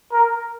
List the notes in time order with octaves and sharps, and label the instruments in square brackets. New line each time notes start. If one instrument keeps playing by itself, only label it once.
[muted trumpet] A#4